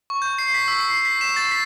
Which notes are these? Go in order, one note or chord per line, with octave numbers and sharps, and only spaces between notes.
C#6
G6
C7
B6
E6
C7
C7
B6
E7
A6
B6